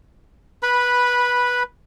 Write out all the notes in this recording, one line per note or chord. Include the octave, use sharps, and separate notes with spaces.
B4 B5